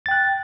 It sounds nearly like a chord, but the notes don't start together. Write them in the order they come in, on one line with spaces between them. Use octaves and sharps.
A6 G5 F#6